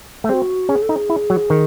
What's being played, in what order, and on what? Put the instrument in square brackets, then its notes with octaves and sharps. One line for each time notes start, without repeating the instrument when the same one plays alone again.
[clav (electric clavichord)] A3
[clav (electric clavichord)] C4 [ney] F#4 G#4
[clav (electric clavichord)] C#4 [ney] G#4
[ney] A4
[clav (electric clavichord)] D#4
[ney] G#4
[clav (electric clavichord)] E4
F#3
D#3